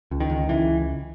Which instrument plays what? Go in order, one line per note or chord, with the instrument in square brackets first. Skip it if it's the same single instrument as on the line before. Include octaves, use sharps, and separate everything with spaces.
[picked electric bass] C#2
D#3
C#2
C#2 E3